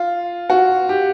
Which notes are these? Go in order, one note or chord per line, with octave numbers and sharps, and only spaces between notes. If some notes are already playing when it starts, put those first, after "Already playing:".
Already playing: F4
F#4
G4